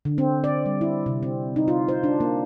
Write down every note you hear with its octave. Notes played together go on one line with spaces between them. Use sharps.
D3
C4
D5
G3
E4
C3
C4
D#4
F4
C5
D4
A#3